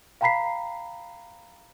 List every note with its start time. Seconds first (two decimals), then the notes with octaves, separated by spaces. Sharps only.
0.21 F5 G5 A#5 B5 B6 C7